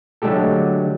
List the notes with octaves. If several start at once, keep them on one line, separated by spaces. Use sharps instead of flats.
D3 F#3 G#3 A3 G4 A4